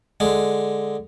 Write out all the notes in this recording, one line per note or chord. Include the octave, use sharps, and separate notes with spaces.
D3 G#3